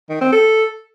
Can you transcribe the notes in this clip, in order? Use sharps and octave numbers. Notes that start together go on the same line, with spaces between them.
D#3
C4
A4